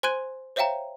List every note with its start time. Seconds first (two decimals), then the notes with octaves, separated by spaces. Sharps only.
0.03 C5 G#5 C6 F#6 G#6 D#7
0.56 C5 C#5 E5 F5 G5 A#5